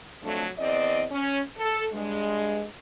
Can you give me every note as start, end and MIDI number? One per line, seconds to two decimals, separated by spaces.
0.23 0.46 41
0.23 0.46 54
0.23 0.46 57
0.23 0.46 62
0.58 1.05 40
0.58 1.05 60
0.58 1.05 74
0.58 1.05 75
1.11 1.41 61
1.58 1.86 69
1.93 2.64 43
1.93 2.64 56